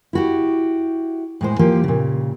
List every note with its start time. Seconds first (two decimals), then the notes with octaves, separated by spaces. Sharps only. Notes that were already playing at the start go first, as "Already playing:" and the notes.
0.13 E4 F#4 G4
1.41 A2 G#3 C5
1.59 F3 A#3 G4
1.84 A#2 C#3